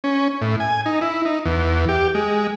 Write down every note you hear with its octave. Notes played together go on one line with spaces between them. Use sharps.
C#4
A2
G#5
D#4
E4
D#4
E2
G4
G#3